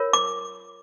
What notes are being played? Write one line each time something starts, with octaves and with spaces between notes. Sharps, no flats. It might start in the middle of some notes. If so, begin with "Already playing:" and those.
Already playing: F4 A#4 C#5
D6